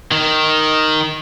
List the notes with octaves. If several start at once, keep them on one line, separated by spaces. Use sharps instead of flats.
D#3